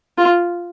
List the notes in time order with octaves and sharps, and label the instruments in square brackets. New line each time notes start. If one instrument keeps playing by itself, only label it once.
[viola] F4